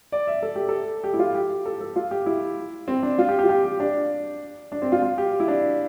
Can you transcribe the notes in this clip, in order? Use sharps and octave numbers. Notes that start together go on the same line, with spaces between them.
D5
E5
A4
G4
A4
G4
E4
F4
G4
A4
A4
F4
G4
E4
C4
D4
F4
G4
G4
F4
G4
G4
D4
D4
C4
F4
F4
G4
E4
D4